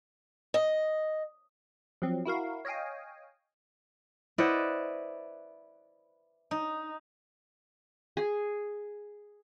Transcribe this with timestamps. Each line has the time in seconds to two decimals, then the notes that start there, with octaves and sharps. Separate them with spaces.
0.54 D#5
2.02 F3 F#3 C4
2.25 E4 F#4 A#4 F5
2.65 C#5 D#5 F5 G5 G#5
4.38 E4 B4 C5 D5 D#5 F#5
6.51 D#4
8.17 G#4